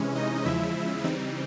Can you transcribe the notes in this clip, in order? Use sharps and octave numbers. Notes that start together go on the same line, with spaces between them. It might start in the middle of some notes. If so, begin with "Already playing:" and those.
Already playing: C3 E3 G#3 C#4
D#4 D#5
E2 C#3 F3 G#3 E4 E5
C#3 E3 G3 C4 D#4